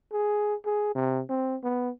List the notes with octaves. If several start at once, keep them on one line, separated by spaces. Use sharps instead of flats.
G#4
G#4
C3
C4
B3